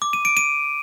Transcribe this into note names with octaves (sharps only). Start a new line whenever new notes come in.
D6
D#7
D7
D#7